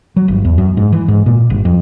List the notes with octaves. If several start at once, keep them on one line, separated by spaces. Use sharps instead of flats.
F#3
G1
E2
F#2
G#2
E3
G#2
A#2
G1
F2